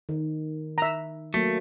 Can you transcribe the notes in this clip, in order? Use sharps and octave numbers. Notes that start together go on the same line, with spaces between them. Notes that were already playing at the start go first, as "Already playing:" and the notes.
D#3
E5 A#5
F#3 A3 A#3